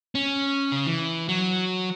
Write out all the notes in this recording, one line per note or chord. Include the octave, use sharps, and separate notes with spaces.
C#4
C#3
E3
F#3